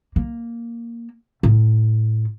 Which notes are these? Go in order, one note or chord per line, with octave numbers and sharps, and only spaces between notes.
A#3
A2